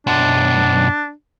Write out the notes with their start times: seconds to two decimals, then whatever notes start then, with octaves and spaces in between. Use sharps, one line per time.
0.07 B1 F#2 D4